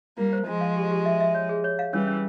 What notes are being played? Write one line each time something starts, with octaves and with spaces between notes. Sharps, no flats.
G3 A#3 F4
C5
F3 G#3 F4
F5
G4
G4
E5
E5
C#5
G#4
C#5
F5
E3 G3 C#4
C#4